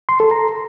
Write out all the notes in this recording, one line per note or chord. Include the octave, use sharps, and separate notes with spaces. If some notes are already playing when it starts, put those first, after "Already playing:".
C6
A4
A#5